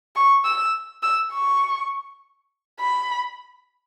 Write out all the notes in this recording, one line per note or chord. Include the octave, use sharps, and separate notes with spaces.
C#6
E6
E6
C#6
B5